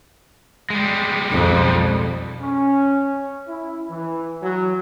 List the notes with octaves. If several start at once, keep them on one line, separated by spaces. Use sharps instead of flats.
G3 G#3
B1 F2
C#4
E4
E3
F#3